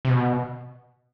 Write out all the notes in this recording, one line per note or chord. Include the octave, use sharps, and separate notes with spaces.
C3
B2